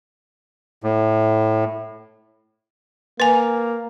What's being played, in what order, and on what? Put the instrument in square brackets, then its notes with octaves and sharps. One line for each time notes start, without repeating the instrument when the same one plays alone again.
[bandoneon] A2
[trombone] A#3 [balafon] B4 G#5